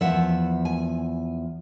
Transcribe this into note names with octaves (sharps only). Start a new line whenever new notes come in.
E2 C#3 F3 E5 F#5
G#5